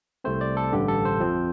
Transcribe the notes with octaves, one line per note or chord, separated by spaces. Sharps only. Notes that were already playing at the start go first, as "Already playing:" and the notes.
C2 C3 A3 C4 C5
D5
A4
A1 G2 D3 G4
A4
C5
F2 F3 C4